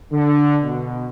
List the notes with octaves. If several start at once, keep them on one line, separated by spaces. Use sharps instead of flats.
D3
B2